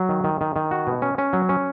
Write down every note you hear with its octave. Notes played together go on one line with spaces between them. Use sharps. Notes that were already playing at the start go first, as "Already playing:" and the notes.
Already playing: F#3
D#3
D#3
D#3
D#3
F#4
B2
C#4
C#4
F#3
C#4